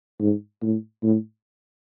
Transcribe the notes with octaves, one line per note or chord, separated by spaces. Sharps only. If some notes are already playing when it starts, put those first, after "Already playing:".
G#2
A2
A2